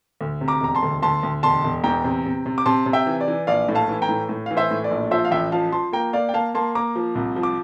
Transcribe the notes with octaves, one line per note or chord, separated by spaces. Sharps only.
D2
C3
A#5 D6
E1 A#5
A5 C6
D2
D2 A5 C6
D2
E1 A5 C6
E1
E2 G5 A#5
C3
C3
C3
D6
C3 A5 C6
C3
E5 G5
E3
D5
E3
A#1 D5 F5
A2
F5 A5
E3
G5 A#5
A2
A2
E3 F5
C5 E5
A2
D5
A#1
F3 C5 E5
F5
A1 E5 G5
F3 F5 A5
F3 A5 C6
A#3 G5 A#5
A#3 D5 F5
G5
A#3 F5 A5
A#3 A5 C6
A#3 A#5 D6
F3
C2
F3
D6